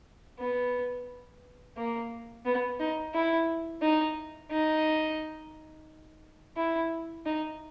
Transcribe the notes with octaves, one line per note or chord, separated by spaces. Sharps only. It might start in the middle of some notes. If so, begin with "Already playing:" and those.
B3
A#3
B3
D#4
E4
D#4
D#4
E4
D#4